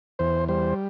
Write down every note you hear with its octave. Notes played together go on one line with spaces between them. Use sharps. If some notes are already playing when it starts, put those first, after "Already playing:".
E2 C5
G3 C5